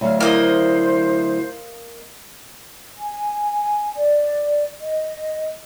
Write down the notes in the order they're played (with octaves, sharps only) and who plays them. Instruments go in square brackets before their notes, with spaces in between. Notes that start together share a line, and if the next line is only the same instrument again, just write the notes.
[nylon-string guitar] D2 F#3 F5 [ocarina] C#5
[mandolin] A#3 D#5 [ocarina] E4 [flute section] C5
[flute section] G#5
D5
D#5